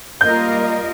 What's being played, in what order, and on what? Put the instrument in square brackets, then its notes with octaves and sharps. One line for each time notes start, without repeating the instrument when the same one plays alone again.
[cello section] G3 A#3 F4 A#4 D#5 [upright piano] G6